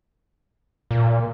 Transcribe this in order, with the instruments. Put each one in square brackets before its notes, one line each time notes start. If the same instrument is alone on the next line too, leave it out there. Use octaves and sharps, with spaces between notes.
[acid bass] A#2